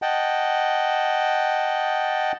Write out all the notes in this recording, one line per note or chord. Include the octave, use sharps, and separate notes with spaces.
D#5 F#5 G5 A5